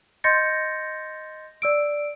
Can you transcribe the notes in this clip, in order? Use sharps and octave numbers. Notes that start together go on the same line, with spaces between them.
D#5 C6 G6 A6 A#6 C#7
D5 E6 D7